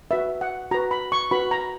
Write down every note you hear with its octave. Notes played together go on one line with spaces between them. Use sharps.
F#4 B4 E5
F#5
F#4 B4 A#5
B5
C#6
F#4 B4 B5
A#5